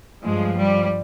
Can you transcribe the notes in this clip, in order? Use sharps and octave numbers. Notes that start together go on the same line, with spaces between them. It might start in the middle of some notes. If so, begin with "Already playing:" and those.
G2 F3 G#3
G3